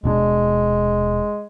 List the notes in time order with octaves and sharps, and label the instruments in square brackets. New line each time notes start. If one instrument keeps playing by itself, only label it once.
[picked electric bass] D#1 B2 D4 [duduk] G#3